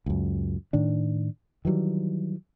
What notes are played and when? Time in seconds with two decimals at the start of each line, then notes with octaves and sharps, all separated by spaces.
0.06 C#2 F#2
0.73 A2 D#3 D4
1.65 D#3 E3 F#3 G3